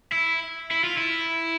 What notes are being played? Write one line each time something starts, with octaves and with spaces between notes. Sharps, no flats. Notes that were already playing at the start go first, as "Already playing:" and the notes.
E4
E4
F4
E4